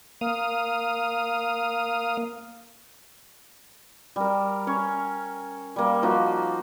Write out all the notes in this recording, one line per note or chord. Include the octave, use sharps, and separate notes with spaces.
A#3 F5 D#6
G3 A#4
C#4 C#5
G3 A#3
F3 A#3 D#4 F#4